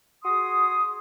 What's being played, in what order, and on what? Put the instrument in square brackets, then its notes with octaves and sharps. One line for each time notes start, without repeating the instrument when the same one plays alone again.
[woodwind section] F#4 G#4 C6 D#6